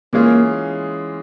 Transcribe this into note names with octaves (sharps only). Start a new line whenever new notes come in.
E3 G#3 A#3 C#4 F4 G#4